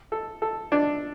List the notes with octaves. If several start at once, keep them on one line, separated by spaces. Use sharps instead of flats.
A4
A4
D4